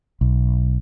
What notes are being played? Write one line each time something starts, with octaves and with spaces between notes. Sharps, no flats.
B1